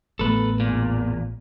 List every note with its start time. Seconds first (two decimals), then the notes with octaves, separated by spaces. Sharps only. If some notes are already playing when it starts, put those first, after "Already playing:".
0.19 A1 A3 B3 A4 B4
0.60 E2 A#2